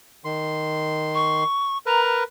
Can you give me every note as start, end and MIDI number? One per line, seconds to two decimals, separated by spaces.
0.25 1.44 51
0.25 1.44 84
1.14 1.78 85
1.86 2.24 70
1.86 2.24 71
1.86 2.17 82